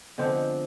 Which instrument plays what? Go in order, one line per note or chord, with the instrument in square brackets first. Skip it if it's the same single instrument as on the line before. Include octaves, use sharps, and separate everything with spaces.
[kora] D3 F3 G#3 B3 C4